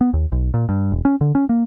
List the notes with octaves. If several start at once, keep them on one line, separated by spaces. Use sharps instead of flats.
B3
D#2
B1
A#2
G2
E1
C#4
D3
C#4
A#3